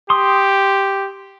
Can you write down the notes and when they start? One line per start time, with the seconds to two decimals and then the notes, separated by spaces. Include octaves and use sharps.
0.10 G4 C6 D#6